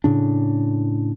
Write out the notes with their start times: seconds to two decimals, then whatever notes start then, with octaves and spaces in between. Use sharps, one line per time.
0.04 A2 C#3 D4